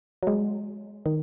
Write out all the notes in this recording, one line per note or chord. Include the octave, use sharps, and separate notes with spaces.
F#3
G#3
D#3